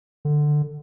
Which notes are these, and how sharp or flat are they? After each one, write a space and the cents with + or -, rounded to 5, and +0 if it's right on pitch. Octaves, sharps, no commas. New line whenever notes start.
D3 +15